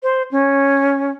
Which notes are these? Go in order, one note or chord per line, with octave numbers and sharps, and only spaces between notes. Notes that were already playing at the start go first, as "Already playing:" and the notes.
C5
C#4